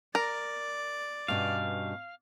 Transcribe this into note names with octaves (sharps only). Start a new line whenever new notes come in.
A#4 D5
G2 B2 C#4 F5